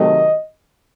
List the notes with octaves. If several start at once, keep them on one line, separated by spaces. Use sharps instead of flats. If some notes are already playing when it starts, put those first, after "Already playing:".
Already playing: C3 D#3 F#3 A3 D#5